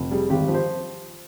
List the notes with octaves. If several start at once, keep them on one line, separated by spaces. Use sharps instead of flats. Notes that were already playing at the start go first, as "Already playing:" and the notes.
Already playing: F1
G3 G#4
G#1 G4
F3
C5